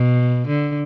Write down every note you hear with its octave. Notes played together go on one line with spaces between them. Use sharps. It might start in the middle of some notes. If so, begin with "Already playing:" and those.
Already playing: B2
D3